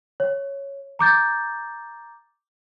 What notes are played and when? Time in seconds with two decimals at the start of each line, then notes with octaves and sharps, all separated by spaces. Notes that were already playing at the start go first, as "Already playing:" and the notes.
0.20 C#5
0.99 A#5 D6 G6 A6